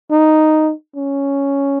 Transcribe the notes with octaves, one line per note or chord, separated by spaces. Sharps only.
D#4
C#4